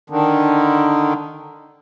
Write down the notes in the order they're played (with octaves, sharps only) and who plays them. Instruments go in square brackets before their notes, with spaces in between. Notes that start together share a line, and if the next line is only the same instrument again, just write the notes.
[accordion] D3 D#3